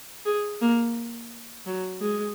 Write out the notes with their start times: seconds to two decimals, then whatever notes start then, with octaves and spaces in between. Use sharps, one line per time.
0.25 G#4
0.61 A#3
1.66 F#3
2.01 G#3